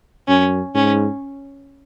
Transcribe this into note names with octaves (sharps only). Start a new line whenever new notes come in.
F#2 C#4
G#2 C#4